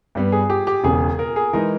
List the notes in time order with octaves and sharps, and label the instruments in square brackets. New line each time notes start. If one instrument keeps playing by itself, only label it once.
[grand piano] G2 G3 B3
[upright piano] G#4
G4
G4
[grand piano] E1 E2 C#3 [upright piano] G#4
[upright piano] A#4
G#4
[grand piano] E3 G#3 D#4 [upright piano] A#4